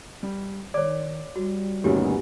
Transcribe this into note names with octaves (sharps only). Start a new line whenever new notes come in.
G3
D#3 C#5 D5 D6
G3 F#4
D2 G2 A#2 D#3 B3 C#4 F#4 G4